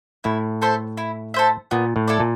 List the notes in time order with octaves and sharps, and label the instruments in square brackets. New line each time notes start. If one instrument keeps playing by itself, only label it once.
[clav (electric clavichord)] A2 [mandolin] E4
[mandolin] A4 C5 E5
E4
A4 C5 E5
[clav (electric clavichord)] A#2 [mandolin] B3
[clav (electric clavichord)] A2
[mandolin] E4 A4 D5
[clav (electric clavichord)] A#2